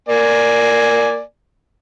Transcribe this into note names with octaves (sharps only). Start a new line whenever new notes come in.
A#3 D5 G#5